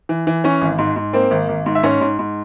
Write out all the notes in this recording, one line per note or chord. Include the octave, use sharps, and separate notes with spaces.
E3
E3
E3 C#4 C#5
G#1
G#2
G#2
A#3 C4 C5
G#1
G#1
G#2
E5
G#2 C#4 C#5
G#2
G#2